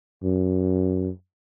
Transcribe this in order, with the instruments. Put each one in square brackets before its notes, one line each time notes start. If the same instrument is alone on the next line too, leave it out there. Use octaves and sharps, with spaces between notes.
[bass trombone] F#2